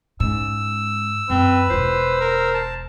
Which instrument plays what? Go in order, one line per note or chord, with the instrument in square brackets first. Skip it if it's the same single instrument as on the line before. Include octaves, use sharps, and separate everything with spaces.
[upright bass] G#2 C#3 [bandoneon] E6
[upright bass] F#2 [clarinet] C4 [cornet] B4
[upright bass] E1 F4 [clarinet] C5
[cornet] A#4
[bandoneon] A5